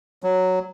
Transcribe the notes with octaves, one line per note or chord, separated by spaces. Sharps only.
F#3